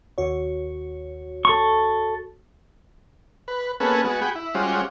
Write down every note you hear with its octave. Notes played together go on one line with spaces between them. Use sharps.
D#2 F#4 C#5
A4 C#6
B4
A#3 B3 C#4 G#4 A4 B4
G#3 B3 F#4
F#4 G#4 G5 B5
E4
G3 G#3 C#4 F4 F#4 C5